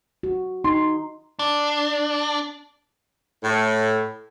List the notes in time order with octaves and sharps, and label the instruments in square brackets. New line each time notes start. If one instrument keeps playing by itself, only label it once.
[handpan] F#4
[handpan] D#4 [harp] C6
[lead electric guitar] D4
[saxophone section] A2